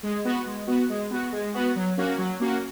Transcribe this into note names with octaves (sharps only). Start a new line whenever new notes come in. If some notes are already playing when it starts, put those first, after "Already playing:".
G#3
B3 F#4
G#3
B3 F#4
G#3
B3 F#4
G#3
B3 F#4
F#3
A#3 C#4 F#4
F#3
A#3 C#4 F#4